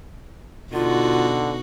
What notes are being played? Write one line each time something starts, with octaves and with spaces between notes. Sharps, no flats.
B2 D3 D#4 F4 F#4